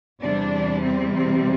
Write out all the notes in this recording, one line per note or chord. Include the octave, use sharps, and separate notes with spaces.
E2 C3 G3 D4
C4
C4